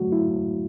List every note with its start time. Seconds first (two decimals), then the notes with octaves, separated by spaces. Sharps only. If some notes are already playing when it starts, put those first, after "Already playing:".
Already playing: D3 F#3 A3 F#4
0.12 E4